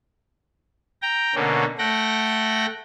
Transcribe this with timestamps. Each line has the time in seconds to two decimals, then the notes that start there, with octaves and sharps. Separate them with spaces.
1.02 G5 A#5
1.35 B2 D3 A#3 C#4
1.78 A3 F#5 G5 A#6